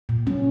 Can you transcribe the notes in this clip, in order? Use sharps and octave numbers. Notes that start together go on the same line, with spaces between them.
A#2
F#3 C#4